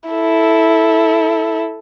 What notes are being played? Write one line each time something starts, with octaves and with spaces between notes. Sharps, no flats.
E4 A4